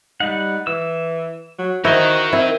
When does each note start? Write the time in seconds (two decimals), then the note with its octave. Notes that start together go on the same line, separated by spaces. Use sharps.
0.20 G3 D#4 F#5
0.67 E3 E6
1.58 F#3
1.85 E4 F#4 A#4 C5 D#5
2.33 C4 E4